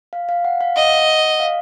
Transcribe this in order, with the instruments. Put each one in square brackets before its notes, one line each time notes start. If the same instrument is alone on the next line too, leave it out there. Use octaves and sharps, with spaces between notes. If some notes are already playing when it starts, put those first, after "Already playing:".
[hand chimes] F5
F5
F#5
F5
[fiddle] D#5 [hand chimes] F#5
[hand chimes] F5